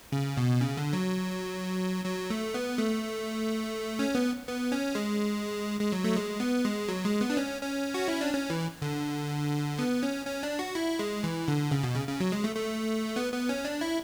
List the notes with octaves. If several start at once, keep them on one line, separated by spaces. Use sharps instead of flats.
C#3
B2
C#3
D3
F#3
F#3
A3
B3
A3
C#4
B3
B3
C#4
G#3
G#3
F#3
A3
G#3
B3
G#3
F#3
G#3
B3
D4
C#4
C#4
F#4
E4
D4
C#4
E3
D3
B3
C#4
C#4
D4
F#4
E4
G#3
E3
D3
C#3
B2
C#3
C#3
F#3
G#3
A3
A3
B3
B3
C#4
D4
E4